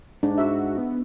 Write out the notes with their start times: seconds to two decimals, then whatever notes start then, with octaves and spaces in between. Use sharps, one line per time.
0.23 G#2 D4
0.38 F#4 E5
0.77 B3